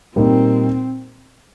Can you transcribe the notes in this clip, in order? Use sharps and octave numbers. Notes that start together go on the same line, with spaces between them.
A#2 G3 A#3 C4 D#4